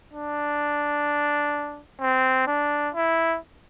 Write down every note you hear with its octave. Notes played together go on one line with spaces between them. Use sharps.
D4
C4
D4
E4